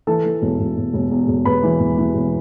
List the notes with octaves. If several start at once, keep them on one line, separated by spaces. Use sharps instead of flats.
E3 A4 A5
E3
E1
E1
E1
E1
E2
E1
E1 B4 B5
E3
E1
E3
E1